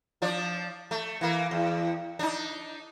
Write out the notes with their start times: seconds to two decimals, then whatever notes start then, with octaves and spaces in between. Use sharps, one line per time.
0.22 F3 D4 D5
0.91 A3
1.21 E3 A#3
1.51 E2
2.19 D4 D#4